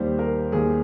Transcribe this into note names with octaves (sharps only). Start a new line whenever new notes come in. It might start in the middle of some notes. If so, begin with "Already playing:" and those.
Already playing: D#2 D#3 G3 C5
A#4
D#2 D#3 G3 G#4